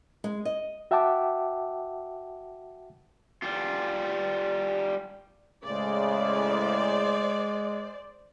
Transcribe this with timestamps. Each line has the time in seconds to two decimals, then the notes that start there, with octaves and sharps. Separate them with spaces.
0.24 G#3
0.45 D#5
0.91 F#4 E5 F#5 G5 A5 D6
3.43 G3 F4
5.64 A2 C#3 G#3 C5 D5